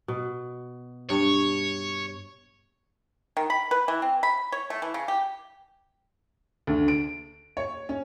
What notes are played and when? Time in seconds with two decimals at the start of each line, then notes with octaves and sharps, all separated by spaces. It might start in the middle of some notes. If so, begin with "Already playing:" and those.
0.08 B2
1.10 G2 C#5
3.37 D#3
3.50 B5
3.71 B4
3.88 E3
4.02 C4
4.23 B5
4.52 C#5
4.70 A3
4.82 E3
4.94 C#3
5.08 G4
6.67 D2
6.88 D7
7.57 C#5
7.89 C#4